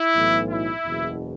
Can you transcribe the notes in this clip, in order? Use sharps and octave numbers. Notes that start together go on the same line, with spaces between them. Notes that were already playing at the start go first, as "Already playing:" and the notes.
Already playing: E4
B1 A2 E3
E4
F#1 E2 B2